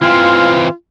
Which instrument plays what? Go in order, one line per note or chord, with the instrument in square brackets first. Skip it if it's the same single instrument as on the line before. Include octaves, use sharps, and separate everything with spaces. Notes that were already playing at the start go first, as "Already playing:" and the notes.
[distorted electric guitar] E3 C4 [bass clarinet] F4 [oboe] F5